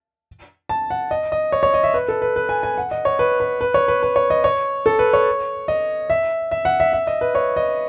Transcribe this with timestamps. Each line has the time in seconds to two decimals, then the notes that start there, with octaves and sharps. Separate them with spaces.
0.69 A5
0.90 F#5
1.11 D#5
1.32 D#5
1.52 C#5
1.63 C#5
1.74 D#5
1.83 E5
1.94 B4
2.08 A4
2.22 B4
2.36 B4
2.49 G#5
2.63 G#5
2.78 F#5
2.91 D#5
3.05 C#5
3.19 B4
3.40 B4
3.61 B4
3.74 C#5
3.88 B4
4.03 B4
4.16 C#5
4.30 D#5
4.44 C#5
4.86 A4
4.99 B4
5.13 C#5
5.68 D#5
6.10 E5
6.51 E5
6.65 F#5
6.80 E5
6.93 E5
7.07 D#5
7.21 B4
7.35 C#5
7.56 D#5